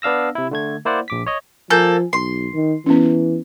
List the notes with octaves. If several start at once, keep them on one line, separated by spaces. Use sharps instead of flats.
B3 D4 F5 E6 A#6
C3 E4
D3 A3 G#6
A#3 E4 C5 D5 F#5
A#1 D6 B6
C#5 D#5
F3 A#3 A4 G#5 G6
B1 C6
D#3
E3 B3 C#4